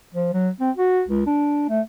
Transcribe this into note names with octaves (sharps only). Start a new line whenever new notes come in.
F3
F#3
C4
F#4
C#2
D4
A3